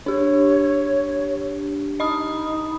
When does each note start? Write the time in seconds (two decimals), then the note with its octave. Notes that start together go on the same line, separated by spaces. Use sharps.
0.06 D4 G4 C#5
2.00 D#4 D#5 B5 D#6